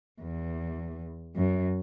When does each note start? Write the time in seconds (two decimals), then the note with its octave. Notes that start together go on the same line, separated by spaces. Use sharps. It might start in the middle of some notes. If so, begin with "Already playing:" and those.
0.22 E2
1.36 F#2